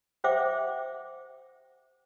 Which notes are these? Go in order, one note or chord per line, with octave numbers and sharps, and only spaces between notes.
G4 C5 E5 F#5 G5 D6